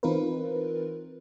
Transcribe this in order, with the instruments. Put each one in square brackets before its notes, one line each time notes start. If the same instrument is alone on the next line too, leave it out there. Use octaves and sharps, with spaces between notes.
[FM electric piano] E3 C4 D#4 F4 A#4 B4